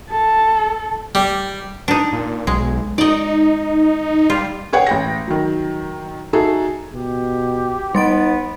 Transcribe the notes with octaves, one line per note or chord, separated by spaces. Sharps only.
A4
G3
D4 D#4
A#2
B1 G#3
D#4 D5 D#5
G3 F4
G#4 B4 C#5 F#5 G5
A1 G5 A#6
D#3 F#3
D#4 F#4 G#4 A4 E5
B2 G4
G3 B3 D#4 A6 D7